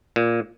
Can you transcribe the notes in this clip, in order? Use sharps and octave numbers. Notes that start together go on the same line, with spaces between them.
A#2